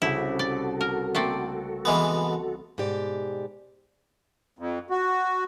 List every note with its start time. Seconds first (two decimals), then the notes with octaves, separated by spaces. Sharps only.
0.02 C2 C#3 E4 F#4 G4 A4
0.39 D5
0.81 A#4
1.15 A3 A#3 C4 D5 D7
1.85 E3 G#3 B3
2.78 G#2 B2 G4 D5
4.59 F2
4.90 F#4